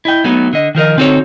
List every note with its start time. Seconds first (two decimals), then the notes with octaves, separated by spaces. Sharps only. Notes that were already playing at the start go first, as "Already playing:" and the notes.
0.05 E4 D#5 G5
0.24 F#3 A3 B3 D#4
0.53 D3 D#5
0.75 D#3 F3 A#4 D#5
0.97 D3 C4 D#4 F#4 A4 C#5